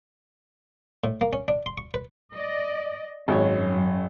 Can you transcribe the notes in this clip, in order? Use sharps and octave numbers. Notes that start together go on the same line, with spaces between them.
A2
A#3
C#4
D4
C6
C#6
B4
D5 D#5
G#1 F#2 C#5